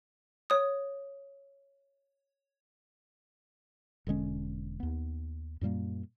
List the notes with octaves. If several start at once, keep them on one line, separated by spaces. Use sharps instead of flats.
C#5 D#6
E1 D3 G#3 C#4
D#2 B3
F#2 A#2 G3 A#3